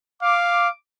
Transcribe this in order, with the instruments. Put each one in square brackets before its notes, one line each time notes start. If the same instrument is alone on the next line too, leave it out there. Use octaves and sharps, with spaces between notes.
[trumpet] F5 [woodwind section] D6